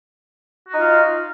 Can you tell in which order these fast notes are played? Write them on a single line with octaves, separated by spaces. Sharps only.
F#4 D#4 F4 F5